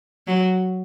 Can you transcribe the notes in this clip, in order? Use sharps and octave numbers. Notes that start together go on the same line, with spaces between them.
F#3